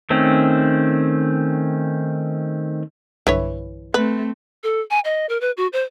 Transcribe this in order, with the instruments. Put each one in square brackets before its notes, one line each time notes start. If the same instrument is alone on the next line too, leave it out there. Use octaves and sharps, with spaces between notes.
[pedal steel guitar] D#3 A3 C4 C#4
[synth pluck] B1 G2 D3 [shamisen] E3 B4 C#5
[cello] A3 C4 [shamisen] B4
[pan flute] A4
G#5
D#5
A#4
B4
F#4
C5